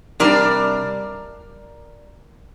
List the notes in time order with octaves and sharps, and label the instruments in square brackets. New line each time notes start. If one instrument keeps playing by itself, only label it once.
[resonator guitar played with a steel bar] C3 G3 D4 A#4 D5